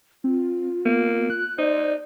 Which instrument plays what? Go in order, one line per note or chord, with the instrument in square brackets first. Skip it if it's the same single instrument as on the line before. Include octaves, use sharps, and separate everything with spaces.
[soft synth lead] C4 [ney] F4
[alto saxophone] A#3 [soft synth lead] B3
[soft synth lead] F#6
[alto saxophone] D#4 [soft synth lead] C5 [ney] D5